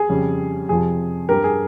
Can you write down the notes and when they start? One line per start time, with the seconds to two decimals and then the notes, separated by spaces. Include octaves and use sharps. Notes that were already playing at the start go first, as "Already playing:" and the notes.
Already playing: G#4
0.09 F2 C#3 G3
0.69 F2 C3 F3 G#4
1.28 G2 G3 G4 A#4
1.44 G#4